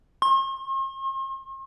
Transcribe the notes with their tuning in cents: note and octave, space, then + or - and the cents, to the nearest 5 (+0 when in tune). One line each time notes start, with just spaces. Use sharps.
C6 +45